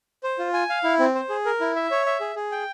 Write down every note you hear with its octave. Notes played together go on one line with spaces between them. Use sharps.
C5
F4
G#5
F5
E4
C4
C5
G#4
A#4
E4
E5
C#5
E5
G#4
G#4
G5